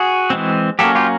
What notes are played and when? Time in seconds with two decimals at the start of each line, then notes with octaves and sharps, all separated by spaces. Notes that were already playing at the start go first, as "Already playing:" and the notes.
Already playing: F#4 G#4
0.30 E3 G#3 C4
0.79 F#3 A#3 C#4 G4 A4
0.95 F4 G4